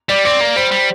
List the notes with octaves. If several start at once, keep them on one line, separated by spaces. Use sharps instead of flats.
G3 D5
C4 D5
A#3 D5
G3 C5
G3